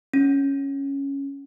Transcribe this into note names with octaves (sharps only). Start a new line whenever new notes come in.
C#4